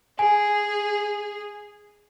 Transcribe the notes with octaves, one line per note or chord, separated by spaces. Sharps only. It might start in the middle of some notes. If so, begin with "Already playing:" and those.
G#4 G#5